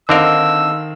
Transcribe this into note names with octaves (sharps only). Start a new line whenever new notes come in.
D3 D#3 C4 D#4 A#4 D#5 F5 E6